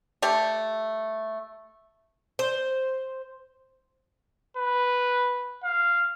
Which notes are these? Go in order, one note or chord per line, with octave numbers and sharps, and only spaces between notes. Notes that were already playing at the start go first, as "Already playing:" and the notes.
A3 G4 D5
C5
B4
F5